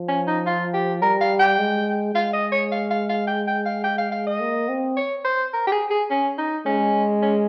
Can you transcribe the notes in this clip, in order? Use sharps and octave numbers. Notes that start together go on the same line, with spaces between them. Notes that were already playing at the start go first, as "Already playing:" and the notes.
Already playing: F3
C#4
D#4
F4
G4
G3 A#4
F5
G5
G#3
G#3 F5
D#5
C#5
F5
F5
F5
G5
G5
F5
G5
F5
F5
D#5
A#3
C4
C#5
C5
A#4
G4
G#4
G#4
C#4
D#4
G#3 C#4
C#4